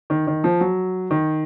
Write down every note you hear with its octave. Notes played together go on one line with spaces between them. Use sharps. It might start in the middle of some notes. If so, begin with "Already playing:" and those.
D#3
D#3
F3
F#3
D#3